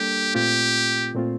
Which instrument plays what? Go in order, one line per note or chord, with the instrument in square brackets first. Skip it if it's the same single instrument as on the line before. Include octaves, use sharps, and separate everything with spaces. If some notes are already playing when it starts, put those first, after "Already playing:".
Already playing: [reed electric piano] G3 A#3 D4 A4 [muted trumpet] G4
[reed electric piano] A#2 A3 C4 F4 [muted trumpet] G4
[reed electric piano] A#2 A3 C4 F4